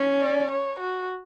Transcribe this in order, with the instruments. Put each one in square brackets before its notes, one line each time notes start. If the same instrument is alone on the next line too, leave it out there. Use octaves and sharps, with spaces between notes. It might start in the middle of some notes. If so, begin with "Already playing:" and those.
Already playing: [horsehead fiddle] C#4
[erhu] D5
C#5
F#4